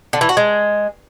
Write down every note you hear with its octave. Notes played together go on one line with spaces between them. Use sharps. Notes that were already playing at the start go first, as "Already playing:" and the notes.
D3
E3
F#4
G#3